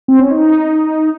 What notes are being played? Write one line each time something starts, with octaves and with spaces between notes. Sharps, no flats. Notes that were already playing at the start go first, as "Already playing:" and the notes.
C4
C#4
D#4